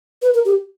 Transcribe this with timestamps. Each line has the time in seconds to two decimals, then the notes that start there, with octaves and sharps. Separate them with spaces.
0.22 B4
0.34 A#4
0.45 G4